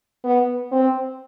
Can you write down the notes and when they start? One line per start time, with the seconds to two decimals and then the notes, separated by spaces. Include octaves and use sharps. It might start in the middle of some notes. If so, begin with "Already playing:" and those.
0.25 B3
0.72 C4